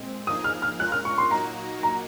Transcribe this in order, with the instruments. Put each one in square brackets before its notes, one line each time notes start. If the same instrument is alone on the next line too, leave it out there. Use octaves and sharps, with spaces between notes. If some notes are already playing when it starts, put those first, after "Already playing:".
Already playing: [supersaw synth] A#2 G#3 C4
[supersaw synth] F3 A#3 D#4 G#4 [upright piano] D#6
[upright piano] F6
F6
[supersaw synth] G#3 C#4 F4 A#4 [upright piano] F#6
[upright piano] F6
C#6
C6
[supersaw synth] A#2 F#3 A#3 D#4 F#4 [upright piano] A#5
[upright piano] A#5